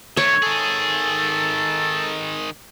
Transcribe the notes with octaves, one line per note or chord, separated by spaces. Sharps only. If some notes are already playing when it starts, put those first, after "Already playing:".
D#3 A3 C#5
D#3 G#4 A4